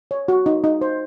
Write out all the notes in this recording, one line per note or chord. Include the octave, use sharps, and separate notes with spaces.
C#5
F#4
D#4
D#4
C5